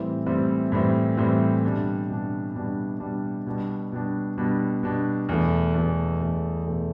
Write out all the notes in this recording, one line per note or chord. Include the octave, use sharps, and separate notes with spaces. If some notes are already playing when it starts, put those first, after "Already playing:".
Already playing: A2 E3 G3 C4 E4
A2 E3 G3 C4 E4
A2 E3 G3 C4 E4
A2 E3 G3 C4 E4
B2 G3 D4
B2 G3 D4
B2 G3 D4
B2 G3 D4
B2 G3 D4
B2 G3 D4
B2 G3 D4
B2 G3 D4
E2 B2 A3
E2 B2 A3
E2 B2 A3
E2 B2 A3